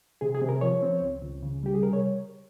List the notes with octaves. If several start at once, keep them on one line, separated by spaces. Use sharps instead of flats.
C3 G#4
G#4
C3
A#4
F3 C#5
C4
C#2
C#2
C#3
G3 G4
G#4
C3 A#4
C#5